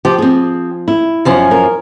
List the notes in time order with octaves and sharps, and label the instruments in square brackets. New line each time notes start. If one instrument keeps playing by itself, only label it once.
[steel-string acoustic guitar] F3 [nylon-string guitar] G4
[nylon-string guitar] C4 G#4
E4
[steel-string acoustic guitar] F#2 F3 C#4
[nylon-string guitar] A#4